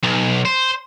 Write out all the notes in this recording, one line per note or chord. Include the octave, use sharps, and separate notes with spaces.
B1
C5